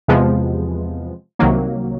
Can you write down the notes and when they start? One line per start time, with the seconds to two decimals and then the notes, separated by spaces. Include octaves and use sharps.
0.08 E2 C3 F3 G#3 B3
1.39 C2 C3 D#3 F#3 A#3